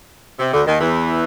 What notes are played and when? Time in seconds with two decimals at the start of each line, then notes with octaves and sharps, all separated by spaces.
0.39 C3
0.53 D2 D3
0.67 D#2 D#3
0.80 E2 E3